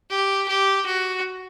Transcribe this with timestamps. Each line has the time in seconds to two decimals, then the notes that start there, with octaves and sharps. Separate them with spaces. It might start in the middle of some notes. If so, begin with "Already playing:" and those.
0.10 G4
0.48 G4
0.86 F#4